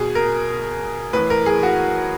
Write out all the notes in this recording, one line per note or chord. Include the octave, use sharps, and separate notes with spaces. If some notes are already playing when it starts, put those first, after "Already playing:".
Already playing: B2 G#4
A#4
A2 E3 B4
A#4
G#4
F#4